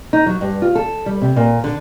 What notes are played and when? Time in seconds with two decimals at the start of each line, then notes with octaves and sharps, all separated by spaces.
0.13 D#4
0.26 F#3
0.41 G2
0.62 F4
0.75 A4
1.06 G3
1.22 C3
1.36 A#2
1.64 D3